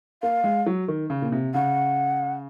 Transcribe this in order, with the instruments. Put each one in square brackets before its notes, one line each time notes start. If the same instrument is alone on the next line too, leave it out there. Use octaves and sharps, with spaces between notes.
[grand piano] A#3 [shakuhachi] F5
[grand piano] G#3
F#3
D#3
C#3
A#2
C3
[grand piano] C#3 [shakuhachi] F#5